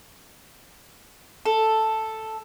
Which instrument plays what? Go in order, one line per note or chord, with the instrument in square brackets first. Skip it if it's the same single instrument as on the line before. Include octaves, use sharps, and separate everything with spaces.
[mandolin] A4